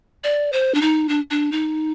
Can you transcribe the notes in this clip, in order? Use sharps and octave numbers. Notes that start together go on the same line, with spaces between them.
D5
C5
D4
D#4
D4
D4
D#4